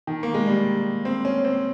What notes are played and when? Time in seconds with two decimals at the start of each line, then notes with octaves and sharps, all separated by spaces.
0.07 D#3
0.23 A#3
0.34 G#3
0.47 G3
1.05 C4
1.25 C#4
1.45 C4